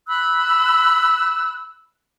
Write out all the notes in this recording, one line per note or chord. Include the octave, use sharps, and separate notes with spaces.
B5 E6 F#6